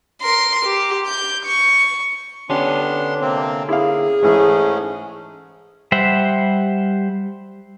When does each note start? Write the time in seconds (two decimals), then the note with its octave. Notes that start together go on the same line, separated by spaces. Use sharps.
0.22 A#4 C6
0.65 G4
1.06 G6
1.45 C#6
2.50 D3 B3 C#4 D4 G4 C6
3.21 C3 A#3 C4
3.69 A#3 E4 G#4 F5
4.23 G#2 E3 G#3 A3 C#4
5.92 G3 C5 E5 F#5